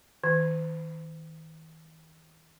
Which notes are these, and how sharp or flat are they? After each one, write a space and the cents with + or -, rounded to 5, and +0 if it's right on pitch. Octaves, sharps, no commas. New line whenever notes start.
D#3 +45